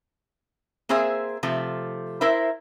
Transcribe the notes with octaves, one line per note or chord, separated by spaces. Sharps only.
A#3 C4 G#4 C5 E5
C3 F3 A3
E4 A#4 C5 E5